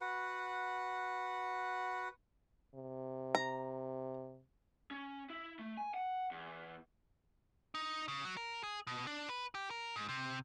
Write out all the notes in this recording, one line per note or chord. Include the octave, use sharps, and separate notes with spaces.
F#4 B4 F#5
C3
A#5
C#4
E4
A3
G#5
F#5
E2
D#4
C#3
F#3
A#4
G#4
B2
D4
B4
G4
A#4
G#2
C3